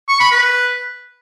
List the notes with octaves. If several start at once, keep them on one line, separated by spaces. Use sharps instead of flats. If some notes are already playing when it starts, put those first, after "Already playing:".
C#6
B5
B4